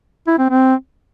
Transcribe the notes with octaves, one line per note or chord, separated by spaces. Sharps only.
E4
C4
C4